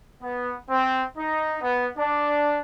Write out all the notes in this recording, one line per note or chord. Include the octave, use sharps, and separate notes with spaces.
B3
C4
D#4
B3
D4